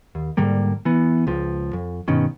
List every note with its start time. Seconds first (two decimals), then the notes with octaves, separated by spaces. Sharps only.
0.15 D#2
0.37 G#2 D3 G3 A#3
0.85 E3 B3
1.27 C#2 F3
1.73 F2
2.08 G2 B2 D#3 C#4